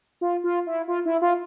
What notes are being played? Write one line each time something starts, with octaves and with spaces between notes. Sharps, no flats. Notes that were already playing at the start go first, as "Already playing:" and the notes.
F4
F4
E4
F4
E4
F4